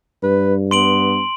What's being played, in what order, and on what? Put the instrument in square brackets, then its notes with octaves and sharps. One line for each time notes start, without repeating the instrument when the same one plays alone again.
[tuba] G2 [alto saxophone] B4
[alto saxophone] B3 [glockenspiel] C6 D7 F#7